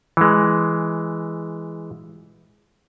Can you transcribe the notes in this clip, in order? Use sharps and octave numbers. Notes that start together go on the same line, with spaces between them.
E3 G#3